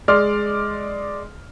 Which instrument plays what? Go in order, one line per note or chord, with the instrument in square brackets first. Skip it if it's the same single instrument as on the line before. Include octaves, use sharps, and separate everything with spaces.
[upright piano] G#3 D5 C6 F6